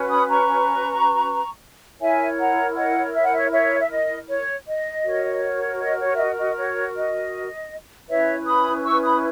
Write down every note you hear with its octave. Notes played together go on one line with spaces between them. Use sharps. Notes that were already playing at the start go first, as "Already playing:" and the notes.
Already playing: C#4 F#4 B4
B5 D#6
A#5 C#6
E4 A#4 C#5 E5 G#5
F#5 A#5
D#5 F#5
E5
F#5
C#5 E5
C#5 E5
E5
D#5
C#5
D#5
F#4 A#4 C#5
D#5
C#5
E5
D#5
D#5
C#5
D#5
C#4 E4 B4 C#5 E5
B5 D#6
C#6 E6
B5 D#6